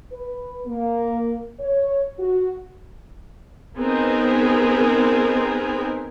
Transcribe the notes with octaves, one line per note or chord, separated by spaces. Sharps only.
B4
A#3
C#5
F#4
B3 C4 D#4 G#4 A#4 B4